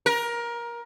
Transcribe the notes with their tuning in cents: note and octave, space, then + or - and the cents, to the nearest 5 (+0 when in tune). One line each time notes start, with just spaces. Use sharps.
A#4 +20